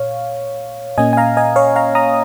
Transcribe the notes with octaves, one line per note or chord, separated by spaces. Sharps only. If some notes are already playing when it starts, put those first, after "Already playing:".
Already playing: A#2 C#5 F5
A#2 A#3 C#4 D#5 G#5
G#5
F5 A#5
D#5 G#5
C#5 F5
F5 A#5
A#5 D#6